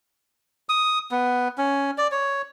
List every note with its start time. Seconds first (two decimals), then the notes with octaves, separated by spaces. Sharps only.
0.69 D#6
1.11 B3
1.58 C#4
1.98 D5
2.12 C#5